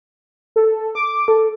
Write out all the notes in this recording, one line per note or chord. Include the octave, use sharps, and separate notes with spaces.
A4
D6
A4